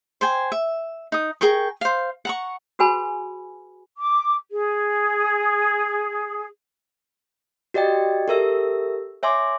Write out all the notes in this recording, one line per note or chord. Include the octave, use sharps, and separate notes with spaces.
C5 G5 G#5
E5
D#4 D#6
G#4 A#4 G5 C#6
C5 F5
F#5 A#5 C#6
F#4 G#4 B4 G#5 B5
D6
G#4
F#4 G4 D5 D#5 G5
G4 A4 A#4 E5 E6
C#5 E5 G#5 C6 D6